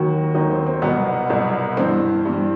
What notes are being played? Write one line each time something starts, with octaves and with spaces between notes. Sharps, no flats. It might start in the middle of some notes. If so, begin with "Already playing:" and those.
Already playing: D#2 D#3 F#3 F#4
D#2 D#3 F#3 D#4
C4
C4
C2 B2 F#3 B3
C2 B2 F#3
G2 E3 C4
G2 E3